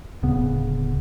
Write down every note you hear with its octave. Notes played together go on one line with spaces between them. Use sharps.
D1 C#3 B3